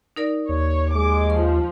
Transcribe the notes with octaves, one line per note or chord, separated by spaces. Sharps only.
D#4 A#4 D5
D#2 C#5
G#3 D6
F3 C#6